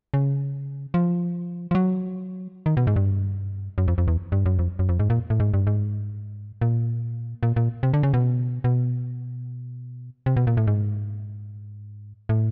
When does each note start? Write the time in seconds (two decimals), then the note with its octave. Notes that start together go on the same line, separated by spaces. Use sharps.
0.14 C#3
0.94 F3
1.71 F3
1.75 F#3
2.66 D#3
2.77 B2
2.87 G#2
2.96 G2
3.78 F#2
3.88 F2
3.98 F2
4.08 E2
4.32 G2
4.46 F#2
4.59 F2
4.79 F#2
4.89 F2
4.99 G#2
5.10 A#2
5.30 A2
5.40 G#2
5.54 G2
5.67 G#2
6.61 A#2
7.43 A#2
7.56 A#2
7.83 C3
7.94 D3
8.03 C#3
8.14 B2
8.64 B2
10.26 C3
10.37 B2
10.47 A#2
10.57 A2
10.67 G#2
12.29 A2